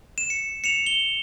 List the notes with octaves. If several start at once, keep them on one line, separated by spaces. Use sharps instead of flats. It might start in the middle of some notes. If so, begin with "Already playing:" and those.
E7
C#7
C#7 E7 F7
G7